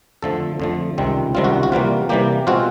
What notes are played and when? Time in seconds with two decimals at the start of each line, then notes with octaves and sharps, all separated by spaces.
0.22 F2 D3 F3 A3 A4
0.60 F2 D3 F3 A3
0.98 C#2 C3 D#3 G3 C4
1.35 C#2 C3 D#3 G3 C4 F4
1.44 F#4
1.63 F#4
1.72 C3 E3 G3 A#3 F4
2.09 C3 E3 G3 A#3 G4
2.47 B2 G#3 C4 F4 F#4